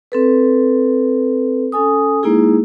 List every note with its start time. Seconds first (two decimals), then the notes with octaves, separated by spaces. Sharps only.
0.12 C4 A4 B4
1.72 C#4 A4 G#5 D#6
2.23 G#3 A#3 D#4 E4 G#4